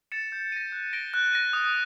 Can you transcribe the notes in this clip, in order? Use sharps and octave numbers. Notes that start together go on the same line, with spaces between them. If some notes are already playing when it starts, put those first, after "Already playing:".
A6 C#7 E7
G6
A#6 D#7
F#6
A#6 D7 G7
F#6
A#6 D#7
D#6